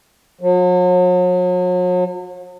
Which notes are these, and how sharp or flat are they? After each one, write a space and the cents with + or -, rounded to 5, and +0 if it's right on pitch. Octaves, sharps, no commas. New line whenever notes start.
F#3 -40